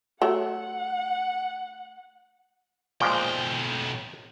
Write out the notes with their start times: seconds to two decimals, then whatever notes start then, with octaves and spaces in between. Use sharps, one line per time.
0.22 F#3 A3 F#5
3.01 B1 A#2 F3 G#3 G5